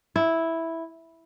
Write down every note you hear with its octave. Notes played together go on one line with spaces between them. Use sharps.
E4